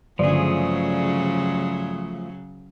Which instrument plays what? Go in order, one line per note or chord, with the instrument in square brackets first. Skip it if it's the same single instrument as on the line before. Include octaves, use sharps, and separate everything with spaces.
[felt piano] G1 D5 [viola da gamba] C#3 F#3 [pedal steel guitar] F3 A3 G#4